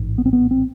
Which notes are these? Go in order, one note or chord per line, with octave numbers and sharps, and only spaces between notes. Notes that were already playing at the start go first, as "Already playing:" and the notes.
Already playing: A1 G#2
B3
C4
B3
C4